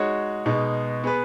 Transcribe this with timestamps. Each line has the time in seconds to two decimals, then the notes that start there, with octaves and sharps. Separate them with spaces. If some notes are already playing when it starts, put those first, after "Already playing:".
Already playing: G#3 D#4 F#4 C#5
0.46 B2 G#3 D#4
1.04 B3 G#4 B4